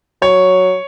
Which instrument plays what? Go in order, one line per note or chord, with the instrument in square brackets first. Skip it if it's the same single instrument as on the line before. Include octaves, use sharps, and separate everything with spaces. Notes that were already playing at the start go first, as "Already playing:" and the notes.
[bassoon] F#3 [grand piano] C#5